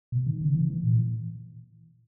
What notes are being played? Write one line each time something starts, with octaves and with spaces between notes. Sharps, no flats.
B2
D#3
C#3
E3
E3
A#2